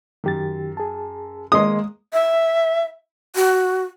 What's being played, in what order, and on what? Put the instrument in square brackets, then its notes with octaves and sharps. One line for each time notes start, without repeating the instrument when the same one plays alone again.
[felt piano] F#2 [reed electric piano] D#3 G4 A6
[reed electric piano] G#4 A5
[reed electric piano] D#3 D#5 C6 [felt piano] G#3 A#3 G#4 [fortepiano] D#6
[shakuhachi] E5
F#4